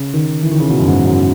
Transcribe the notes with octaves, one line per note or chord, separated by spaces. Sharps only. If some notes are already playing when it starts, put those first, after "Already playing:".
Already playing: C#3
D#3
E3
D#3
C#3
B2
F#2
G#2
F#2